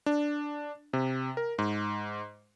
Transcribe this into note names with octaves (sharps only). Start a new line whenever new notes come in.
D4
C3
A#4
G#2